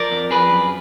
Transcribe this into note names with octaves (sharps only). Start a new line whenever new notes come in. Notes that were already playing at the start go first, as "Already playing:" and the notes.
Already playing: F3 A#4 D5
F2
F3 G#4 B4
F#2